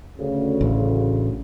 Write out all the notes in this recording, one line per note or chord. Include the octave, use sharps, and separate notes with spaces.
D2 C#3
A1